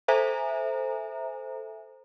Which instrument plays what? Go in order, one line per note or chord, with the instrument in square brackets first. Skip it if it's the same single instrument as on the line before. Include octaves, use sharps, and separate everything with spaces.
[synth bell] A4 C5 E5 G#5 A#5